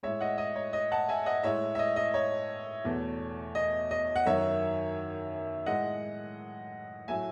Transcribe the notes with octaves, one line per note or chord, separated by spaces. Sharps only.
A2 G#3 C#5 E5
D#5 F#5
D#5
C#5
D#5
F#5 A5
E5 G#5
D#5 F#5
A2 G#3 C#5 E5
E5
D#5
D#5
C#5
E2 B2 A3
D#5
D#5
F#5
F#2 D#3 F#3 C#5 E5
A2 G#3 D#5 F#5
A2 F#3 A3 E5 G#5